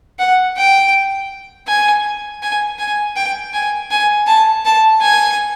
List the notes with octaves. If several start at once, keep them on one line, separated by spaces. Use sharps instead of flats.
F#5
G5
G#5
G#5
G#5
G5
G#5
G#5
A5
A5
G#5